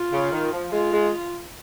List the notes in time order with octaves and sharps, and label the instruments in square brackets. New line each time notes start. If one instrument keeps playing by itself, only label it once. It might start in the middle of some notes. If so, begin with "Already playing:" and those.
Already playing: [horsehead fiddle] F4
[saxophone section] C#3
D#3
F3
[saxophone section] G#3 [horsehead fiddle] F4
[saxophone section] G#3